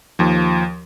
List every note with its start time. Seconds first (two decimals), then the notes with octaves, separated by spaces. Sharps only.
0.19 D#2 F3